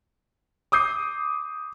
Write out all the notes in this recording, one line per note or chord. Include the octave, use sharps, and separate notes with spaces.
D6 D#6 G6 C7